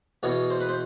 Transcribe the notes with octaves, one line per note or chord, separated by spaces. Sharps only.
E2 B2 C#5
C5
B4
C5